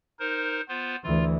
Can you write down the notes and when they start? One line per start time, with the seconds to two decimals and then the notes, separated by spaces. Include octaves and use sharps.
0.20 D#4 A#4 C5
0.69 B3 F4 C5
1.04 D2 E3 F4